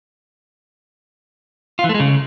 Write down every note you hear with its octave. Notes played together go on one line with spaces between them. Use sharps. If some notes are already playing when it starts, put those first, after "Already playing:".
F4
E3
A3
G#3
C#3